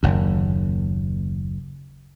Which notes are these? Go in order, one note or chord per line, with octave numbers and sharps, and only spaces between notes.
F#1 D#2